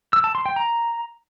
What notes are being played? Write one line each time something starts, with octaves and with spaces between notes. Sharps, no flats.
E6
A5
C6
G5
A#5